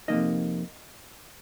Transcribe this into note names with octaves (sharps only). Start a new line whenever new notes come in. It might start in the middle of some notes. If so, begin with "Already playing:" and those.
F2 C3 D#3 A#3 D#4 D#5